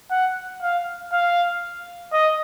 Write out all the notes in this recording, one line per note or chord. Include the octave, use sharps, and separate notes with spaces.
F#5
F5
F5
D#5